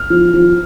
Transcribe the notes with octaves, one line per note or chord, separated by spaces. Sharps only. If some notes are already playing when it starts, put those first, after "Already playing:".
Already playing: F6
F3
F3